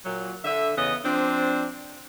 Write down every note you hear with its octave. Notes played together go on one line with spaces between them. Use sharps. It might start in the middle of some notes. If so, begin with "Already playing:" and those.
A#2 F#3
D3 E5
E2 C#3 B3 D#5
F3 C4 D4